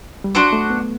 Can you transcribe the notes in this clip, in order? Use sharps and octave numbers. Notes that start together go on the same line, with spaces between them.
G3
F#3 D4 F#4 C5 F#5
A3
B3